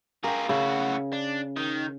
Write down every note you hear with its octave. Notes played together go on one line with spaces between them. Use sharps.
F4 G#4 A#4 G5
A2 C#3 F#4
D4
D#3